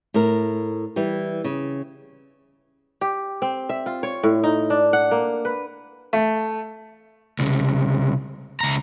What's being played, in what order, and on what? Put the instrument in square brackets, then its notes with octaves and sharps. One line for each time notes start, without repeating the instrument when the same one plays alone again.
[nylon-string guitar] A2 A#4
E3 G3
C#3
[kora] G4
C4
E5
F4
C#5
A2
D#4
D4
F#5
A#3
B4
[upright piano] A3
[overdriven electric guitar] C2 C#3
C#2 A#5